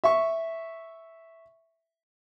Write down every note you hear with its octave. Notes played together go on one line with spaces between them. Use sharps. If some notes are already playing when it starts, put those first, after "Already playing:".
E5 C#6